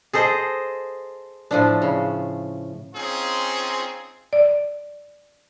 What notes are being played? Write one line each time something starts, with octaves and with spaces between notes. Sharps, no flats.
G#4 A4 C5 D#5
A2 F3 D4
C#3
C4 C#4 D#4 F4 G#4
D5